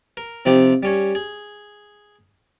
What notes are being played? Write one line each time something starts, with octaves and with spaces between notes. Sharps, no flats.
A#4
C3 F3 C4 D#4 G4 C5
G3 C#4 C#5
G#4